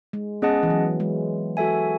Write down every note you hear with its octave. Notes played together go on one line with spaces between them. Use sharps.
G#3
B3 C#4 G#4 D#5 F#5 A5
E3
F#3
G#3
F#4 A4 E5 G#5